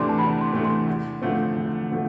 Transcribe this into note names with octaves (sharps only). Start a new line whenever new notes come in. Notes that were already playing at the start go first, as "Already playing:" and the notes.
Already playing: E2 C3 E3 A3 D4 C6
A5
E2 B5
C6
C3 E3 A3 D4
C6
E2
D3 F3 A3 C4
E2
D3 F3 A3